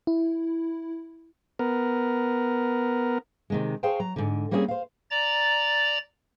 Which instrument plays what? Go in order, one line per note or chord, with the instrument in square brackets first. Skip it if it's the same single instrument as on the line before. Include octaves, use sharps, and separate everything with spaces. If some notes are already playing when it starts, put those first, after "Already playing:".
[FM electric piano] E4
[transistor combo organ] B3 A#4
[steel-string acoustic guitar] C3 D#3 G#3
G#4 C5 C#5 F5 G5 A5
F#3 A#5
G#2 D3
G3 A#3 C4 C#4 E4 G#4
C5 F5
[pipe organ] D5 A#5 A6